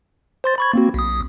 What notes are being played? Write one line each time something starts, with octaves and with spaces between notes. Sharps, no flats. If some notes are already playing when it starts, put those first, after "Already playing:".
C5 C6 A6
B5 C#6 G#6
A#3 C4 F#4
B1 D#6